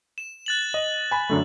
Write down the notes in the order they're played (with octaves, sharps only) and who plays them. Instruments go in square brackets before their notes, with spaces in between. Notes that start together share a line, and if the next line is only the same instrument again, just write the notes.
[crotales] E7
F#6 A6 F#7
[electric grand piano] D#5
G#5 B5
F#2 D3 A3